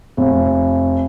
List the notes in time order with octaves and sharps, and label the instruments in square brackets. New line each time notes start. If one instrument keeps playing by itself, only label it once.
[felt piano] F1